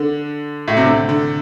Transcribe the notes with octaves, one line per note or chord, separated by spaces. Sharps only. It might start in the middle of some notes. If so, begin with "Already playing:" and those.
Already playing: D3
A2
C3
D3
D3